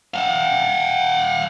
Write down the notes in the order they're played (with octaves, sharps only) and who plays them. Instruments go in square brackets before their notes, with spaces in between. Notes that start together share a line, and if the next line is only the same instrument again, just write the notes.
[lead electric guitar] F5 F#5